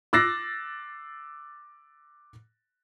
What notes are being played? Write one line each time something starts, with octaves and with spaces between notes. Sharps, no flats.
D6 E6 F#6 A6 A#6 C7